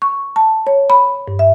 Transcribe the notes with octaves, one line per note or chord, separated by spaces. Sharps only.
C#6
A5
C#5
B5
G2
E5